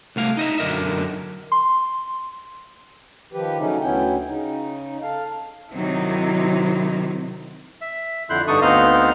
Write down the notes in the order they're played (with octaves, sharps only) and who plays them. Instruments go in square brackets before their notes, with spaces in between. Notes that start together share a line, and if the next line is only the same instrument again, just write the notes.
[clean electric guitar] C2 A3 F5
D#4 D#5 E5
F#2 D3 A#4 D#5 E5
[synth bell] C6
[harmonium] D#3 F3 G4 B4
C#3 F#3 A3 C#4 D#4
D2 B3 C#4 E4 G5
C#3 D#4
A4 F5
[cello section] C3 D#3 F#3 C4 D#4 E4
[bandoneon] E5
F2 D3 E4 C6 F#6 G6
G2 D3 D#4 A4 C#6 D#6
D2 B3 C4 D#4 D#5 F5